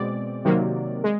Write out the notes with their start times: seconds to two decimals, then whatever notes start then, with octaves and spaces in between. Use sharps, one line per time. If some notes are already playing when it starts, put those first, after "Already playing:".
Already playing: B2 G#3 C4 D5
0.45 C3 D#3 F#3 A#3
1.04 G#3